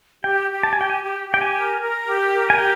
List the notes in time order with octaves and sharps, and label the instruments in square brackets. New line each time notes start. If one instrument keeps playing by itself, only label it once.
[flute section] G4 [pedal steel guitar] G5
[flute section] G4
[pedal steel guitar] A5
G#5
[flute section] G4 [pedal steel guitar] G5
[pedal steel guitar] G#5
[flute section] G4
G4
[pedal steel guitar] G5
G#5
[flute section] A#4
A#4
G4
A#4
[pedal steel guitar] G#5
[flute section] G4 [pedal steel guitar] G5